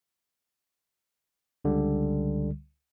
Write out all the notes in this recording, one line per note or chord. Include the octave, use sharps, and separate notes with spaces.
C#2 D3 G3